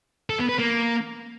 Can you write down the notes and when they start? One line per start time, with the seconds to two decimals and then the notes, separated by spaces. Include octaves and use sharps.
0.30 A4
0.39 B3
0.49 B4
0.59 A#3